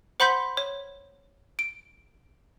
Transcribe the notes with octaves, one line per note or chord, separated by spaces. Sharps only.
C5 F#5 B5 C6 G6 B6
C#5
D7